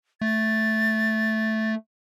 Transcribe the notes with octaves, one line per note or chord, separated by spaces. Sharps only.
A3 A6